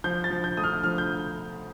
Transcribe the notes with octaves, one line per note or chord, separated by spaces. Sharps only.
F3 G6
A6
F3
G6
A3 D#6
F6
F3 F6
G6